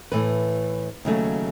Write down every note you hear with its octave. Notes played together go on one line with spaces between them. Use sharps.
A2 E3 A3 B4
D#2 C#3 F#3 A3